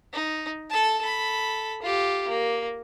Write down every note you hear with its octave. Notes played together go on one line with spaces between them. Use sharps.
D#4
A4 A5
A4 B5
F4 G4
A#3